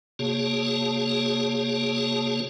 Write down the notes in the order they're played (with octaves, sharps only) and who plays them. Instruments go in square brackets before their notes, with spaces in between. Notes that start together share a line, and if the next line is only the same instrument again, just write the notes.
[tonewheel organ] C3 A#3 F#4 G#4 C#5 A5